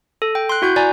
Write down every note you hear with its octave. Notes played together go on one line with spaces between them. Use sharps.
A4
G5
C6 F#6
E4 F#4 F#6 G6
D5 G#5 A#5